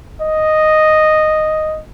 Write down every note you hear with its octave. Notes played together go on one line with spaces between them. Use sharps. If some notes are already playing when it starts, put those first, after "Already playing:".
D#5